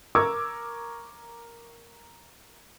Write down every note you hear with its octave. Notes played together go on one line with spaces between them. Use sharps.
A#4 C#6 D6 E6 G#6